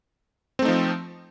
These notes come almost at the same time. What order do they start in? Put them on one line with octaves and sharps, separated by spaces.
C4 A3 D#4 F3